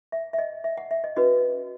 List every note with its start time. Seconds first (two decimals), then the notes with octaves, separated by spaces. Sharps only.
0.12 E5
0.33 E5
0.39 D#5
0.64 E5
0.77 F#5
0.91 E5
1.04 D#5
1.16 C#4 F#4 B4 D#5